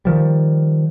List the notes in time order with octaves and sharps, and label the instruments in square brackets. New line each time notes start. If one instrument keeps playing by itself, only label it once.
[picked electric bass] D#3 F3 G3